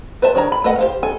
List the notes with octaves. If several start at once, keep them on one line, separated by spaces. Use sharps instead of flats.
B4 C5 E5 A5
D#3 D4 C#5 A#5
B5
A3 B4 D#5 F#5
G4 C5 F5
A4 G#5